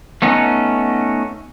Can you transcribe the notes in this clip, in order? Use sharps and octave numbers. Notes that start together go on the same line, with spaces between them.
A3 B3 C#4 D#4